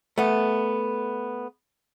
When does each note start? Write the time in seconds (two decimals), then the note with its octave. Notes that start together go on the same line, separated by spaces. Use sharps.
0.18 A3 B3